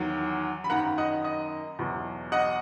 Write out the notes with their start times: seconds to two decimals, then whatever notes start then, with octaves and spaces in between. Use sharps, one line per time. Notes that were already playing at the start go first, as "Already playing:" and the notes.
Already playing: E2 D#3 F#3
0.64 B5
0.70 F#2 D#3 A#3 F#5 A#5
0.98 D#5 F#5
1.24 D#5
1.79 E2 B2 F#3
2.32 D#5 F#5